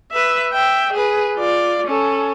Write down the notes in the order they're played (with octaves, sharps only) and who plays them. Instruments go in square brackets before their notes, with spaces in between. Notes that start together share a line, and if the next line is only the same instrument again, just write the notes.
[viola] B4 E5
E5 G5
G#4 B4
F4 D5
C#4 A4